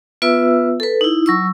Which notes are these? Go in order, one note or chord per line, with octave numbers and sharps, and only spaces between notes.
B3 F4 B4 E5 E6
A4 B4
D#4 E4
F#3 C#6 E6